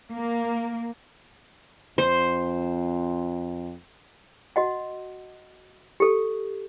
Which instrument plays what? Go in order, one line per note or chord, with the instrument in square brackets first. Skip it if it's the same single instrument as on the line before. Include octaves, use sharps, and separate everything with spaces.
[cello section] A#3
[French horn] F2 [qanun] C5
[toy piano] F#4 D#5 F#5
G4 A4